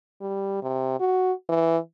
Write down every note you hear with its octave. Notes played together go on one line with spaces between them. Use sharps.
G3
C3
F#4
E3